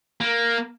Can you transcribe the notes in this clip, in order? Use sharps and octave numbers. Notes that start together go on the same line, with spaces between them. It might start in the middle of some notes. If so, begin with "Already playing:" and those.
A#3